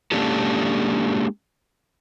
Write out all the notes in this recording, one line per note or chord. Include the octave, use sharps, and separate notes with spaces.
G#3 A#3 C#4 D4 G4 A4